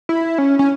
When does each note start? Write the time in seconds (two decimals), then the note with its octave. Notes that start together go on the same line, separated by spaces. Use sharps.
0.09 E4
0.38 C#4
0.59 C#4